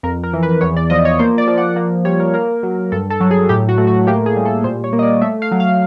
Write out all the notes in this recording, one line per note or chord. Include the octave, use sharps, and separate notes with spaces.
F2 A#4
A#4
E3
B4
E2 C#5
D5
F3 D#5
C#5
A#3 C5
D5
F3
F#5
A#3
G3 C#5
A#4
A#3 A#4
F#3
G2 A4
A4
F#3
G#4
A2 G4
F#4
A3
F#4
A#3 G4
G#4
G3
A4
A#2 C5
C#5
A#3
D#5
D5
A3 E5
F5
F#3
F5